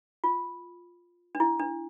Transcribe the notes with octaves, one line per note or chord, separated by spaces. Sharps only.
F4
D4
E4
D4